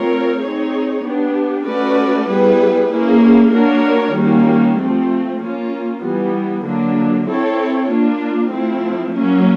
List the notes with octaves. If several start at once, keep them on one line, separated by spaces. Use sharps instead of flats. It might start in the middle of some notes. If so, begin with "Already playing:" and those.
Already playing: A3 C4 F4 A#4 C#5
C4 D#4 G#4 C#5
B3 D4 G4
A3 C#4 F#4 B4 D5
G3 B3 E4 G#4 B4
A#3 C#4 E4 G#4
A#3 D4 F#4 A#4 C#5
D#3 G3 A#3 C#4 F#4
F3 A3 C4
A#3 C#4 F4
E3 G3 B3
D3 F#3 A#3 D4
C4 E4 A4 C#5
A#3 D4 F4
F3 A3 C4 E4
F#3 A#3 C#4